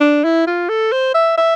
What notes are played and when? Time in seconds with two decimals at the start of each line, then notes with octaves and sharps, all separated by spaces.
0.01 D4
0.24 E4
0.47 F4
0.69 A4
0.92 C5
1.15 E5
1.38 E5